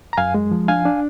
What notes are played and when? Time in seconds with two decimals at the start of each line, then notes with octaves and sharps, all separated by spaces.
0.13 A#5
0.17 F#2 F5 G#5
0.34 G#3
0.51 F3
0.68 D4 F5 G#5
0.85 D4